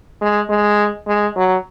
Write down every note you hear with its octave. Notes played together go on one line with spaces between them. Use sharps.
G#3
G#3
G#3
F#3